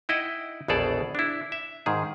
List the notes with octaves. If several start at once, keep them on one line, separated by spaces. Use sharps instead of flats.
D#4 E4 D#5 F#5 G5
A#1 E2 B2 G#4 A4 D5
D4 E4
E5
G#2 D#3 G#4